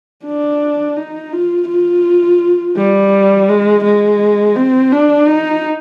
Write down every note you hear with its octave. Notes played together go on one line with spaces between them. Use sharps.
D4
D#4
F4
F4
G3
G#3
G#3
C4
D4
D#4